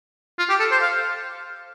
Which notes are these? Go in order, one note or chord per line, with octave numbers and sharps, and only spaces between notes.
F4
G4
A4
C5
F5